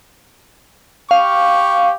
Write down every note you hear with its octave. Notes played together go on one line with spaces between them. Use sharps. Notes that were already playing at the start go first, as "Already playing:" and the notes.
G4 F5 C#6